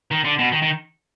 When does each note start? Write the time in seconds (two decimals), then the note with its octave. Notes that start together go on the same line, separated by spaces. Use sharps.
0.11 D#3
0.25 D3
0.39 B2
0.52 D#3
0.62 D#3